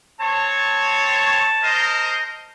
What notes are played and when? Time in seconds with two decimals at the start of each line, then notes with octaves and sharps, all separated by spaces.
0.20 C4 C#5 A5
1.62 A#4 C5 D#5